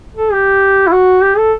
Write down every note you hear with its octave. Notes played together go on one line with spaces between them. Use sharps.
A4
G4
E4
F#4
G4
A4